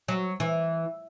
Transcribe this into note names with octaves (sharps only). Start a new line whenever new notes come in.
F#3
E3